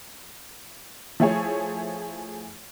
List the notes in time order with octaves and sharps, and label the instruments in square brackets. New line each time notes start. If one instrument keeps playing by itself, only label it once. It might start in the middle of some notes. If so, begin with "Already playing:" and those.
[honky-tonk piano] F3 A3 E4 G#4 C#5